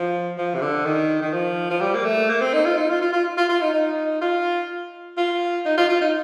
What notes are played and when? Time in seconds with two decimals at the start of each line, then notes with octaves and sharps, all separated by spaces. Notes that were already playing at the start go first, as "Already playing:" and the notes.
Already playing: F3
0.37 F3
0.54 C3
0.61 D3
0.85 D#3
1.22 D#3
1.33 F3
1.70 F3
1.81 G3
1.94 A#3
2.05 A3
2.29 A#3
2.41 C4
2.53 D#4
2.65 F4
2.77 D#4
2.89 F4
3.01 F4
3.13 F4
3.37 F4
3.49 F4
3.61 D#4
3.73 D#4
4.21 F4
5.17 F4
5.65 D#4
5.77 F4
5.89 F4
6.01 D#4